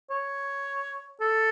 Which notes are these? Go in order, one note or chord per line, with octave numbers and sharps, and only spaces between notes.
C#5
A4